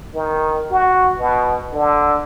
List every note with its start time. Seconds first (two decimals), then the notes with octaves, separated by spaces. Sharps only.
0.14 D#3
0.71 F#4
1.18 B2
1.73 D3